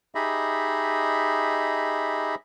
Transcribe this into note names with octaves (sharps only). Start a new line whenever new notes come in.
D#4 G4 G#4 D#5 E5 B5